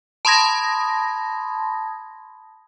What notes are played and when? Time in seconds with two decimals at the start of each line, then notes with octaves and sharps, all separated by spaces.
0.25 A5 B5 C6 D#6 G#6 A#6